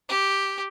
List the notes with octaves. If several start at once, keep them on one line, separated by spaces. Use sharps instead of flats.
G4